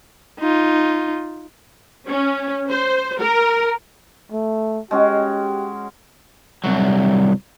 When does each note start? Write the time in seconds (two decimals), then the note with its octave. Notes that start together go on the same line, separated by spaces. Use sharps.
0.39 D#4 F4
2.07 C#4
2.70 C5
3.20 A#4
4.32 A3
4.91 G#3 C#4 F#4 G4
6.64 C2 F#3